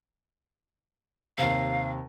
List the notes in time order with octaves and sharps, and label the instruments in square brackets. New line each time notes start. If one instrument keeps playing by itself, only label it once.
[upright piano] D#2 C3 [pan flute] F5